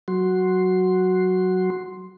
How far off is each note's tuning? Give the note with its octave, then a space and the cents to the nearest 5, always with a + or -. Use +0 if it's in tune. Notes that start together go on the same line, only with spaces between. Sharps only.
F#3 +0 F#4 +0 C6 +0